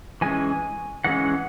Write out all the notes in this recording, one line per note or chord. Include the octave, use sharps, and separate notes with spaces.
E3 G#3 C#4 G#5
E3 G#3 C#4 F#5